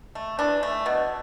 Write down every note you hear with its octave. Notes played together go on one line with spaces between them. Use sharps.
A3
E3 D4
A3
B2